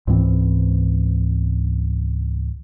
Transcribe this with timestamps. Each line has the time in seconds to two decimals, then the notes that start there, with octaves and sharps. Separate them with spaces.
0.07 C#2 G#2 E3 C4